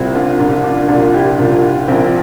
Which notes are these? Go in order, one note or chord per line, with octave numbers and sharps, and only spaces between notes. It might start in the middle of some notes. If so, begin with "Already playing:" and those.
Already playing: C2 A#2 C4 E4
D4 F4
C2 A#2 D4 F4
D4 F4
C2 A#2 D4 F4
E4 G4
C2 A#2 D4 F4
A#1 A#2 C4 E4